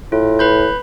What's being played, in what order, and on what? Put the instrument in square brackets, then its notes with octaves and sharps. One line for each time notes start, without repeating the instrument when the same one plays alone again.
[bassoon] A2 [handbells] F4
[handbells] B4 B5 G6